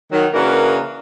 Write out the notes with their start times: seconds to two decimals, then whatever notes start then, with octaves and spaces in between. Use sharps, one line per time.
0.12 D#3 F#3
0.34 C#3 E3 A#3 D4 F#4 A#4